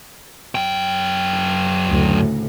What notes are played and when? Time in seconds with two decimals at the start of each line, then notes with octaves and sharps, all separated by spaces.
0.55 F#2 G5
1.89 D2 A2 C#3